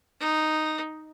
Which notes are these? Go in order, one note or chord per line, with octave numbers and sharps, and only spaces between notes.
D#4